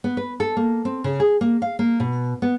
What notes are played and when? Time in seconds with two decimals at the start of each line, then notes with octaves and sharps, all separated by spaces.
0.04 B3
0.17 B4
0.40 A4
0.57 A#3
0.85 C4
1.04 C#3
1.20 G#4
1.41 A#3
1.62 F5
1.79 A#3
2.00 B2
2.42 B3